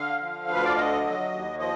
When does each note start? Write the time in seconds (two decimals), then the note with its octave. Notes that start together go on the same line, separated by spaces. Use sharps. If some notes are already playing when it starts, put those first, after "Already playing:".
Already playing: D3 F5
0.21 F3
0.48 D2 B4
0.64 D5
0.76 D3 D#5
1.04 F#3
1.31 D#2
1.59 F3 D#5